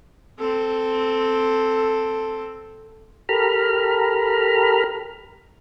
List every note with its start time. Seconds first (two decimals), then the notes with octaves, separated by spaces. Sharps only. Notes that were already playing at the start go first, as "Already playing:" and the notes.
0.39 C4 A4
3.29 G4 A4 A#4 A#5 B5 F6